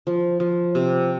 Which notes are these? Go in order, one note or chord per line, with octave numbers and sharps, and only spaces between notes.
F3
F3
C3